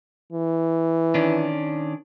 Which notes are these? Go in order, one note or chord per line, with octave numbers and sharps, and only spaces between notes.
E3
D#3 C#4 D4